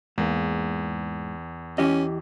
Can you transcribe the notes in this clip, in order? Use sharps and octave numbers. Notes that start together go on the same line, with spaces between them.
E2 G#2 A#3
E3 C#4 G4 D#5